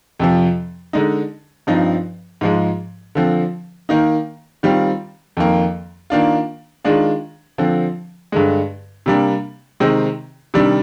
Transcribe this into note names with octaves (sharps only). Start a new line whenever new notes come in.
F2 C3 F3
D3 G#3 D#4
G2 F3 C4 D#4
G#2 F3 G#3
D3 F3 C4
D#3 A#3 D#4
D#3 G3 C4 F4
F2 D#3 A#3
D#3 A#3 D4 F4
D#3 G#3 D4 F4
D3 F3 C4
G2 D3 G#3
C3 G3 A#3 D4
C3 D#3 G#3 C4 D#4
C3 D#3 G3 D4